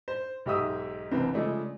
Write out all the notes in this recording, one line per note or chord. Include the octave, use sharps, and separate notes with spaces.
C5
B1 G#2 G4 E5 D#6 E6
F#1 C2 E3 B3 C4
C#3 F3 G#3 A3 D4